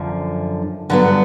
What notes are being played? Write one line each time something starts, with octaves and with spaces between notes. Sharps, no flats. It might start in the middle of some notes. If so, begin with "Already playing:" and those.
Already playing: F#2 D3 F3
G2 D3 F#3 B3